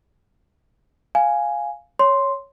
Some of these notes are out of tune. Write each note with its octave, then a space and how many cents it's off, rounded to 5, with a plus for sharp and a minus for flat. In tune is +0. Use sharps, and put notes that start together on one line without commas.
F5 +0 G#5 +0
C#5 +0 C6 +0